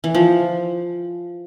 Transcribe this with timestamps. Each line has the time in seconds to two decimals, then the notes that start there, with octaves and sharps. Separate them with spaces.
0.04 E3
0.15 F3